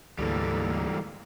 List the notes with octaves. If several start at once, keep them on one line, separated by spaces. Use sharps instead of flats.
D2 G#2 E3 G3 A#3 A4